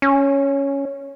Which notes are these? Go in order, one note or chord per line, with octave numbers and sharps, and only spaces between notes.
C#4